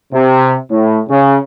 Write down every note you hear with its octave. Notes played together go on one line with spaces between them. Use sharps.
C3
A2
C#3